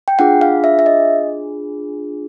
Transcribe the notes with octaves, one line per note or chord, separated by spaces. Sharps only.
G5
D4 F4 G#4 F#5
F5
E5
E5
D#5